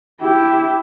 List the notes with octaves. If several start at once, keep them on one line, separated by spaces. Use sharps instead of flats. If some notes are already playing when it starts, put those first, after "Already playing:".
E4 G4